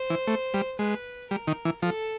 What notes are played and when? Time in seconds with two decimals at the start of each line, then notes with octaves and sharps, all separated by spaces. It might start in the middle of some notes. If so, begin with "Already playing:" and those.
Already playing: C5
0.10 E3
0.27 A3
0.54 G3
0.79 G#3 B4
1.30 G3 A#4
1.47 D#3
1.65 E3
1.82 F3 A4